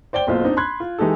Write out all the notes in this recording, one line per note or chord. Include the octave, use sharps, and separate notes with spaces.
C5 D5 G5 G7
F#1 B1 B2 F4 C5
C4 D4 D#4
B5 C6 F#6 G#6
F4
E3 G#3 D#4 G4 A4